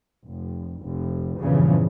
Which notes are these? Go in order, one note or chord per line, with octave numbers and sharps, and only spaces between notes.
F1
F1
E2 G2 A#2 C#3 E3 F3